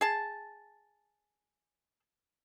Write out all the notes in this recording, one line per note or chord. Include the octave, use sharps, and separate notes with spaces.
G#4 A5